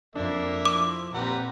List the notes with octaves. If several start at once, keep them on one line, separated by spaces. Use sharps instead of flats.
F2 A#3 D4 E5
F3 E4 D6
A#2 G3 C4 B4 F#5 A#5